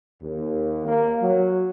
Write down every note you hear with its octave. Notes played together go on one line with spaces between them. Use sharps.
D#2
A#3
F#3